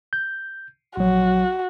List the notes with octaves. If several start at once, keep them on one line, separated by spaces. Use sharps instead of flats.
G6
A#1 F#3 F#4